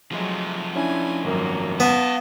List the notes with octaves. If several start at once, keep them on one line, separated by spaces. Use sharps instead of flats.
F3 F#3 G#3 A3
C#4 D4 E4 G#5
G#1 F#2 F#3 A#3
B3 B4 F5 A5